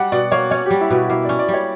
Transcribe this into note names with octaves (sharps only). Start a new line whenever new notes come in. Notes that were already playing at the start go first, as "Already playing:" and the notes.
Already playing: G3 F#5
B2 D5
A#3 C#5
C#4 C#5
G3 G4
E4
B2 F#4
A#3 E4
C#4 D5
D5
G3
C#5